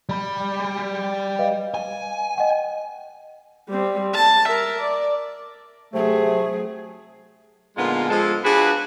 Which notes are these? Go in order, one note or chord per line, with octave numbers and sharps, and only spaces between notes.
G3 B5
B4 D#5 F5
G#5
D#5 F#5 G5
G3 C4
A5
A#4 E5
D5
C3 F#3 A3 G#4
A#2 D3 G#3 B3 D#4 F4
F3 G#3 A4
D4 F4 F#4 G#4 B4